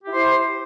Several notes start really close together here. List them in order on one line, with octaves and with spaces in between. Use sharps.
G4 E4 C5